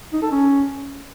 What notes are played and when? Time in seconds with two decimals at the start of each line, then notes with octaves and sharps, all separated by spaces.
0.13 D#4
0.22 A4
0.31 C#4